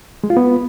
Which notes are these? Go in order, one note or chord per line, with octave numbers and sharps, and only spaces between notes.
G#3
F4
B3